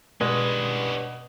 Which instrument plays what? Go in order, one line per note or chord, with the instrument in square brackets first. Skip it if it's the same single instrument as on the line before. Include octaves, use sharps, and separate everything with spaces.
[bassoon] G2 [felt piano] B2 [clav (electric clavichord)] G#3 [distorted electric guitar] C#4 B4